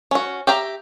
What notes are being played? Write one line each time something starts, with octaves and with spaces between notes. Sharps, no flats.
C#4 F#4
G4 E5 G5 A#5